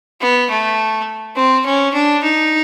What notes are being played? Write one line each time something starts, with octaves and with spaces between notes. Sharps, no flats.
B3
A3
C4
C#4
D4
D#4